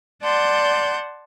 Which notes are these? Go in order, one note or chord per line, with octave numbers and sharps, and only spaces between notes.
D5 F#5 A5 C6 G6